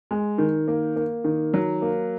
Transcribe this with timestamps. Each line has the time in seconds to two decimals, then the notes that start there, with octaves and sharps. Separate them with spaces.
0.11 G#3
0.38 D#3
0.68 A#3
0.96 A#3
1.24 D#3
1.54 F#3
1.82 A#3